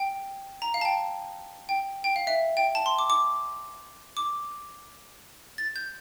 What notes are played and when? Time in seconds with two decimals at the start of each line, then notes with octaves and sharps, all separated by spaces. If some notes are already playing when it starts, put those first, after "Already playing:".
Already playing: G5
0.62 A#5
0.74 F5
0.81 A5
0.85 G5
1.69 G5
2.04 G5
2.16 F5
2.27 E5
2.57 G5
2.75 A5
2.86 C6
2.99 D6
3.10 D6
4.17 D6
5.58 A6
5.76 G6